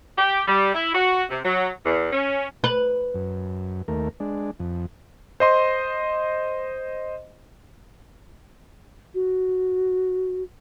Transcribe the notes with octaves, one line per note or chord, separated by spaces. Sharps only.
G4
G3
E4
F#4
C3
F#3
E2
C#4
B4
F#2
D#2 A3 A#4
G#3 D4
F2
C5 D#5 C6
F#4